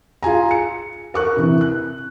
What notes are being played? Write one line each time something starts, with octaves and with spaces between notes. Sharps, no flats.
F4 G#4 G#5 A#5
C#7
A#4 C#6 F#6
C3 E3
F#6